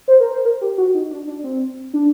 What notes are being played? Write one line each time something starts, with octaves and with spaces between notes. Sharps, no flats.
C5
A#4
C5
A#4
G4
F#4
D#4
D4
D4
C4
D4